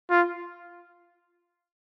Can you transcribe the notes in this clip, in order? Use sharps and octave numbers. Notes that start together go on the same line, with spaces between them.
F4